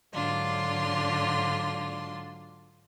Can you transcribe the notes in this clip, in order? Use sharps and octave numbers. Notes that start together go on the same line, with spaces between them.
G#2 D3 F#3 D4 F4 C6